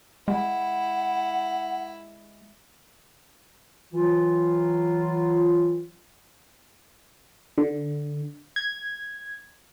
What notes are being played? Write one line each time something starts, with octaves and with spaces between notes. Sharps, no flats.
G#3 E4 F#5
E3 F#3 F4
D3
G#6